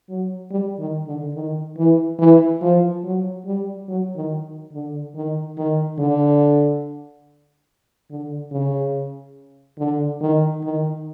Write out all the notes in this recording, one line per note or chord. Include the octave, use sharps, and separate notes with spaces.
F#3
G3
D#3
D3
D#3
E3
E3
F3
F#3
G3
F#3
D#3
D3
D#3
D#3
D3
D3
C#3
D3
D#3
D#3